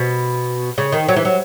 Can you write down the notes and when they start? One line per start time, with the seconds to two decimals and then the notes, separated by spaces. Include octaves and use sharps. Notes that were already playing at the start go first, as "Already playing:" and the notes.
Already playing: B2
0.78 C#3
0.92 D#3
1.08 F#3
1.16 E3
1.25 F#3